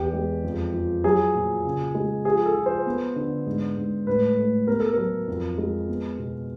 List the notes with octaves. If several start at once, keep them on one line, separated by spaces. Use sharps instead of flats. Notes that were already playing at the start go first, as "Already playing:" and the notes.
Already playing: E2 G4
G#3
F2
F3
F#3 G#4
A#2
C#3
G#3
F3 G#4
A4
F3
C5
B3
D3
G#2
G#2
A2 B4
A3
B3 A#4
A4
F#3 A#4
F2
G#3
B3
B2